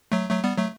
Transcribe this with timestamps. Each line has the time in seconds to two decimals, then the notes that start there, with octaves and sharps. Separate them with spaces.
0.12 F#3 A3
0.31 F#3 A3
0.44 G3 B3
0.57 F#3 A3